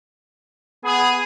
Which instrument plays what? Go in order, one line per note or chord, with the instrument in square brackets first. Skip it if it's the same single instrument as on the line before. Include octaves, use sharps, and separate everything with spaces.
[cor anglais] B3 [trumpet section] G#4